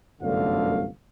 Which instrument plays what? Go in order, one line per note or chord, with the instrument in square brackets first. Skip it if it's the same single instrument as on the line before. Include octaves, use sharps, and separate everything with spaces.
[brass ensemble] G1 C2 F#2 D3 A3 F5